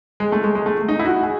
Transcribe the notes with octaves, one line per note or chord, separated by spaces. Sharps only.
G#3
A3
G#3
G#3
A3
D#4
E4
F#4
G#4